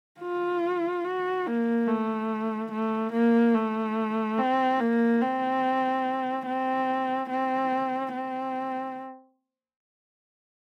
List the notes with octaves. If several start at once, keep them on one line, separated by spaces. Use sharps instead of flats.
F4
F#4
A#3
A3
A3
A#3
A3
C4
A#3
C4
C4
C4
C4